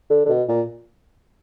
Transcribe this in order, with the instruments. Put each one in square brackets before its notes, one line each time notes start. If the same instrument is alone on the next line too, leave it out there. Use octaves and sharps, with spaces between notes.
[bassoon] D3
D3
B2
A#2